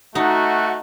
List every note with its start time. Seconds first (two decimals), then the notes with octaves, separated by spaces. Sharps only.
0.15 A3 D#4 F#4